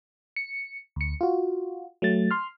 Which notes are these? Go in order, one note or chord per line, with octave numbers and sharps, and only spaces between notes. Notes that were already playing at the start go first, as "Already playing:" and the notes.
C#7
D2 C#7
F4 F#4
F#3 A3 A6
C6 F6